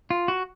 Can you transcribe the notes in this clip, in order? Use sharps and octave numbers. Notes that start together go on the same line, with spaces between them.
F4
F#4